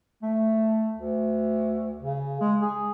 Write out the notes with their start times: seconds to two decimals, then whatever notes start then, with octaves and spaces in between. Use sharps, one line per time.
0.23 A3
0.96 D2
2.03 C#3
2.41 G#3
2.62 G#4